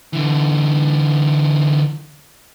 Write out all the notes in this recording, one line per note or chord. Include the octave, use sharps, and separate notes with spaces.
D3 E3